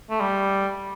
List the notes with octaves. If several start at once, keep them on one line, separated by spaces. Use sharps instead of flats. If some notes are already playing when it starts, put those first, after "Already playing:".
A3
G3